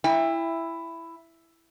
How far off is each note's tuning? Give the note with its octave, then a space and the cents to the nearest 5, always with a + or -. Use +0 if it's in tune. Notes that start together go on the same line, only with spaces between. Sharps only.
E4 +10 G5 +35